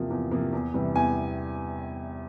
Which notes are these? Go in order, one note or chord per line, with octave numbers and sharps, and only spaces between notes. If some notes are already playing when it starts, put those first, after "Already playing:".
Already playing: E2 C3 F3 A#3
E2
C3 F3 A#3
E2
C3 E3 G3
E2 G#5